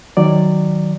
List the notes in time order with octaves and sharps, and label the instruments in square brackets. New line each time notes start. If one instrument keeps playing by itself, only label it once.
[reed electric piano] D#3 F#3 D5